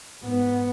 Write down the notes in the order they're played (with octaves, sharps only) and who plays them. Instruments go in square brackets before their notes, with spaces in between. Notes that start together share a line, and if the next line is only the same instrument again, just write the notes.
[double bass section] G#2 B3